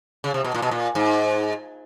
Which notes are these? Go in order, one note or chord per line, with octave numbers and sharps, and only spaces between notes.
C#3
C3
B2
A#2
B2
A#2
G#2